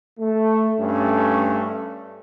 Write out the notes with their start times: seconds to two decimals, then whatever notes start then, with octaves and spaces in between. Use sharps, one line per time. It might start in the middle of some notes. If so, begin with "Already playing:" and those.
0.19 A3
0.80 G2 A3 C#4